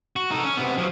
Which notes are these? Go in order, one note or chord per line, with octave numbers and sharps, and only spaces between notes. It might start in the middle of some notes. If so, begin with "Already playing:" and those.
F#4
D#4 A4
C#4
C3 B3
F3 F#3